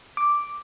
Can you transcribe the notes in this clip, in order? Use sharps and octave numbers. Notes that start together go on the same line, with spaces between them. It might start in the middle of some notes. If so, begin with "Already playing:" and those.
D6